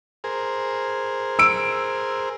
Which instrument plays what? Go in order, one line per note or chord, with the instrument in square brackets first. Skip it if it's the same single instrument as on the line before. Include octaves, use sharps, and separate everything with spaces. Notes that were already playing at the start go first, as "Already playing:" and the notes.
[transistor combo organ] G#4 A#4 C5
[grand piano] E6 D7